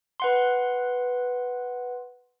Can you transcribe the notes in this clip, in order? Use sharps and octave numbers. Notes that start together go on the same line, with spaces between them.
B4 F#5 C6